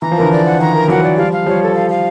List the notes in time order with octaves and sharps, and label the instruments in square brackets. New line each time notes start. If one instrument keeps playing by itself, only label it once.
[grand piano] E3 [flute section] A#5
[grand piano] F3
[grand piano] D3 E3 [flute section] A#4
[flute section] D5
F#5
[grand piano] D#3 F3 [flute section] A#5
[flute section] A#4
[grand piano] E3 F#3 [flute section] F#5
[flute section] D5
[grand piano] F3 G3 [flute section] F5
[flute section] F5
[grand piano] F3 G3 [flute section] C#5
[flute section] A4
F5
F5